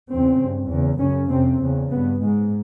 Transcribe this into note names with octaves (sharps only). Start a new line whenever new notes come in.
E2 C#3 C4
G2
E2 C#3
F#2 C#3 C#4
F2 C3 C4
E2 C#3
G2 B3
G#2 G#3